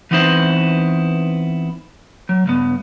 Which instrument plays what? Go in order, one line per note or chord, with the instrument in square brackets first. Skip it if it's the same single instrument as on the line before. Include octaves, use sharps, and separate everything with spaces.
[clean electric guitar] E3 B3 C4 D#4 E4 C5
F#3
C#2 G2 B3